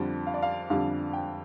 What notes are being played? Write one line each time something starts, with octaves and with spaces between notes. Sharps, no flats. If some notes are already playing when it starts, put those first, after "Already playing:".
Already playing: F2 D3 G3
F5
D5
F5
F2 D3 G3 F5
G5